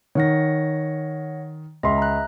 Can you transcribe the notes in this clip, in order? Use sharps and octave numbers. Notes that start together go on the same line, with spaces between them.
D#3 C#5 F#5 A#6
C#2 D#5 E5 C6
A#5 F#6